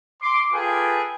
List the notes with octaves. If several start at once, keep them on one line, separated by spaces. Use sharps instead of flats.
C6 D6
F4 G#4 A4 B4 G5 G#5